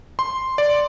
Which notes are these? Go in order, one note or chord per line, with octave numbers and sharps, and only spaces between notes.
C6
D5